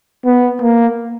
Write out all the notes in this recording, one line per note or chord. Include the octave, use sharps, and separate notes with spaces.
B3
A#3